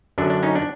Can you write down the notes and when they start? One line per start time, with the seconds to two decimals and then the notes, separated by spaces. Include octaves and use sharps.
0.18 F#2 D3 F#3 D4
0.30 D4
0.43 C#4 D#4
0.55 D4